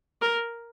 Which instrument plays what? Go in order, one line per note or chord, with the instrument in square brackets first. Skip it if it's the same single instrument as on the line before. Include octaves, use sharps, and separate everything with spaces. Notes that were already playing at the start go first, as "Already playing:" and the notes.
[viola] A#4